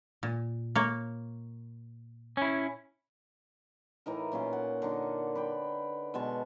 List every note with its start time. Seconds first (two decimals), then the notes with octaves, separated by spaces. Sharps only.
0.23 A#2
0.76 A#3 C#5
2.37 C#4 E4
4.06 A2 E3 D#4 A#4
4.32 A#2 C#4 F5 C6
4.53 F#5
4.82 D3 A#3 D#4
5.35 B4 D5 G5
6.14 B2 G#3 A5 C#6